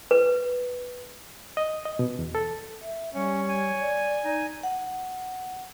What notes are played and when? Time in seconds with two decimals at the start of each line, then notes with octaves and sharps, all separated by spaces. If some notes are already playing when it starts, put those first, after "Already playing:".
0.11 B4
1.57 D#5
1.86 D#5
1.99 B2
2.19 E2
2.35 A4
2.82 E5
3.14 G3 C#4 C#5
3.49 G#5
3.80 D5
4.25 D#4
4.63 F#5